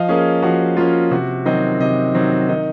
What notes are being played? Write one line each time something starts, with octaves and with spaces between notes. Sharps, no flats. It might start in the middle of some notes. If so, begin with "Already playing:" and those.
Already playing: F3 D#5 F5
A#3 C#4 G#4
F3 F#4
A#3 C#4 F4
C3 F#4
D#3 F#3 C4 D#5
C3 D#5
D#3 F#3 C4
D#3 D#5